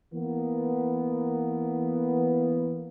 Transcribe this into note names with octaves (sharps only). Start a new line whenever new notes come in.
E3 A#3 B3